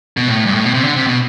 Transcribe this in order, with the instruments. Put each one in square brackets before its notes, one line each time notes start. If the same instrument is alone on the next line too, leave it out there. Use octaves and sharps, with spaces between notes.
[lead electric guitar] B2
A2
G2
A2
B2
C3
D3
C3
B2